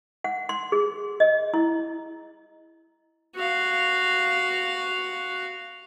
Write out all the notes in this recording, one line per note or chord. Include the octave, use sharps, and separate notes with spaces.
F#5
C6
G#4
D#5
E4
F#4 F5